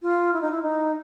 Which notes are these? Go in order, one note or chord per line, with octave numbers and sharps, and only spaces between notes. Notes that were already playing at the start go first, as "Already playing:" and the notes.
F4
E4
D#4
E4
D#4